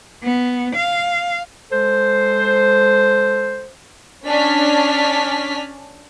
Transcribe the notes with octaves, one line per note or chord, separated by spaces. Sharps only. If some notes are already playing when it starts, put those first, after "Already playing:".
B3
F5
G#3 A4 C5
C#4 D4 F6 B6